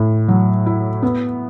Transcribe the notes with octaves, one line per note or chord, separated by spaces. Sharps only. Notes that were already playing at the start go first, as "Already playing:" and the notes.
Already playing: A2
F#3
E4
B3